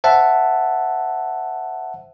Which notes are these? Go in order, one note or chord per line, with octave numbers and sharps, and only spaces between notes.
C5 E5 F#5 A5